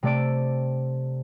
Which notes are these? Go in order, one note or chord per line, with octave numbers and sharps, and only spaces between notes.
C3 A3 A4 D5 E6 D7